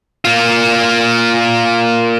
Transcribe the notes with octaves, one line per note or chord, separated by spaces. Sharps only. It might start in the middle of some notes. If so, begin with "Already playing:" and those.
A#3 F4